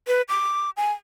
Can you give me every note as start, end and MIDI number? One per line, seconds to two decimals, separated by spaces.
0.07 0.22 71
0.29 0.70 86
0.77 0.92 80